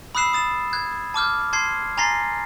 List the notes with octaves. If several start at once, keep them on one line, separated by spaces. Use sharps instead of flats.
B5 D#6 E6 F#6 C7 E7
D#6 A6 E7
F#6 G#6
A5 D6 F6 G6
A5 C6 G#6 C7
G#5 A#5 C6 A6 A#6 C7